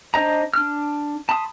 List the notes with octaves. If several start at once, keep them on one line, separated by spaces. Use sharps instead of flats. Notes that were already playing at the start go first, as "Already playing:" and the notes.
D4 C5 D#5 A#5
D4 F6
A5 B5 C6 D#6